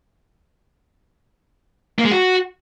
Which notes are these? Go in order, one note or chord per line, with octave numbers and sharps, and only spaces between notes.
A#3
G#3
F#4